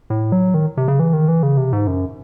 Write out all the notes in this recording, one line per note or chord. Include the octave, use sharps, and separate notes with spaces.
A2
F#3
D#3
C3
C#3
E3
D#3
E3
C#3
C3
G#2
F#2